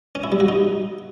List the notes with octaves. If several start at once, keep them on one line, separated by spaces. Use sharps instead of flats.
C#4
E4
G3
F#4
D#4